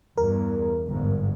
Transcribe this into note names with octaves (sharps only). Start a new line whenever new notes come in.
E2 G2 A#4
G1 G#2